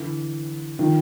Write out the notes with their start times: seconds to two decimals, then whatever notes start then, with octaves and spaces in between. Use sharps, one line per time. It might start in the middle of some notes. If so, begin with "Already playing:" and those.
Already playing: D3 E3
0.79 D#3 F3